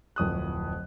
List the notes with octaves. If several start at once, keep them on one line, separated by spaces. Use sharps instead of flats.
D1 F2 D#6 F#6